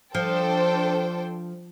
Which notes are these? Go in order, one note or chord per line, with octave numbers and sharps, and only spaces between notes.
F3 D4 A4 C5 G5